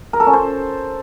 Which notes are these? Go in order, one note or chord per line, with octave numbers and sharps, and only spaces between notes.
A#4
A4
C#4
C5